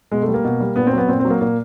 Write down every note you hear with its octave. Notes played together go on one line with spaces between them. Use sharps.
B2 G#3
A3
G3
A#3
B2
G3
A#2 B3
C4
F#3 B3
A#2 C4
C4
F#3
A#3
A#2 A#3